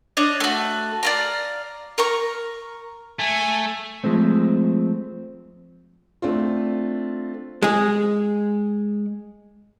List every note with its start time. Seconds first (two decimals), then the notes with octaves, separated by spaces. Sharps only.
0.17 D4 C#5 D#5
0.40 A3 F#4
1.03 D5 F5 A#5
1.98 A#4 A#5 C#6
3.19 A3 G#5
4.04 F3 G#3 A3 C4
6.22 A3 C4 D4 F4
7.63 G#3 G#4